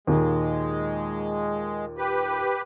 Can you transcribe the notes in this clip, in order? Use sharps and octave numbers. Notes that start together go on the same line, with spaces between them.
D#2 A#2 G#3
G4 B4